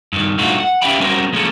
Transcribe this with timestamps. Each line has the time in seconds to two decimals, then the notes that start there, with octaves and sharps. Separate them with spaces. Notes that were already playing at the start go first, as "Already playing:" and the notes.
0.13 G2 D#3
0.38 G2 A#2 A3 D#4 F4 F#4
0.60 F#5
0.82 C#4 G4 E5 F5 G5 B5
1.00 G3 C4 C#4 F#4 A#4 C5
1.33 F3 G#3 A#3 C#4 A4